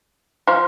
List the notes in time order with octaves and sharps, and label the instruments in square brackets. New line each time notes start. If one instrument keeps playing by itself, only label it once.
[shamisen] F3 F4